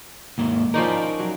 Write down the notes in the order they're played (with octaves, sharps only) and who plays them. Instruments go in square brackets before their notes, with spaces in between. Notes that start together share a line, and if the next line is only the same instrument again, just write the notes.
[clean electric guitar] D#2 G#2 A#3
[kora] F3 C#4 D#4 [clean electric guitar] A#4 D5
[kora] F#3